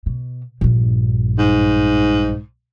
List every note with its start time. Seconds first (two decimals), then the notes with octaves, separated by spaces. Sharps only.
0.06 B2
0.61 A#1 G2
1.39 G#2